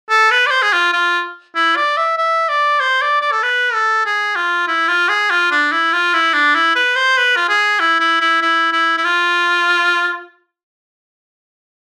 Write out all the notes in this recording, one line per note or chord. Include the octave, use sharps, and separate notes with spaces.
A4
B4
D5
C5
G#4
F4
F4
E4
D5
E5
E5
D5
C5
D5
D5
A4
B4
A4
G#4
F4
E4
F4
G#4
F4
D4
E4
F4
E4
D4
E4
B4
C5
B4
F4
G#4
E4
E4
E4
E4
E4
E4
F4